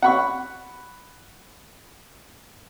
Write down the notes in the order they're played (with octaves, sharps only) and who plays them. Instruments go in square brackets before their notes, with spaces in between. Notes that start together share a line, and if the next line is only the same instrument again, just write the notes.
[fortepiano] F#5 B5 C#6